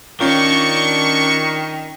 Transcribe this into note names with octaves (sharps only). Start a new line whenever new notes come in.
D#3 C#4 D4 F4 D5 C#6